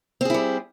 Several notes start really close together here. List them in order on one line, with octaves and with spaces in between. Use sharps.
C4 G#4 E4 G3